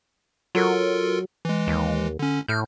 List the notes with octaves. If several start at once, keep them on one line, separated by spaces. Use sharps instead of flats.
F#3 F4 A4 A#4
E3 G#3
D#2
D3 C#4
A2 F6 G6